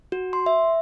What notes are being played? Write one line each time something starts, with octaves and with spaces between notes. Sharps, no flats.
F#4
C6
E5